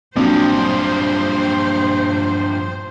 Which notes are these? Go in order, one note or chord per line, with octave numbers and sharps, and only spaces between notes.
A#1 G2 F3 F#3 C4 D4 C5